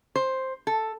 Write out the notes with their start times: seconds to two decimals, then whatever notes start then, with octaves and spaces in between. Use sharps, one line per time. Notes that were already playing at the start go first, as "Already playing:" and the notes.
0.16 C5
0.67 A4